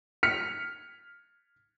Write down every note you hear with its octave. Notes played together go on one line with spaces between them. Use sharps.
F6 B6 C#7 F7